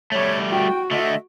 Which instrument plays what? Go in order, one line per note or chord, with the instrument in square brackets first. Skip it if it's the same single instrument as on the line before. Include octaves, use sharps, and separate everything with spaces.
[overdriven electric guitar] G3 A3 [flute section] C#5
[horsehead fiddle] F#4 [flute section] G5
[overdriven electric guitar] D3 A3 [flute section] D#5 E5